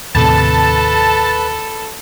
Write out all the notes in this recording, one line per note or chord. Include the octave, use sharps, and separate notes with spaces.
D#2 A2 C3 A4 B4 A5